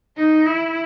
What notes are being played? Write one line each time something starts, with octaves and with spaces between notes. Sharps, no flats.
D#4
E4